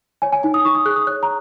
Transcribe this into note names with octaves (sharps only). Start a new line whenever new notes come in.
C#5 G#5
G#5
D#4 G#5
D#6
D#4 C#6
D#6
G#4 F#6
D#6
C#5 F#6
A#5